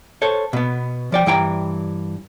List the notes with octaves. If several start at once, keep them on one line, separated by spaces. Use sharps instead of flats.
A4 C5 C#5
B2 B3
F3 D5 G5
G2 E3 G5 A#5